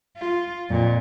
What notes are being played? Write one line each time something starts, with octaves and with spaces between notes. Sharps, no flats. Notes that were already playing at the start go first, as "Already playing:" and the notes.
F4
F2 A#2